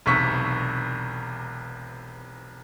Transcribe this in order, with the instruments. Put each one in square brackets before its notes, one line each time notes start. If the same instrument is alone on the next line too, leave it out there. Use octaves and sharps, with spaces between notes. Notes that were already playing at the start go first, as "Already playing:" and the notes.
[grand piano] E1 B1 C3 C#6 B6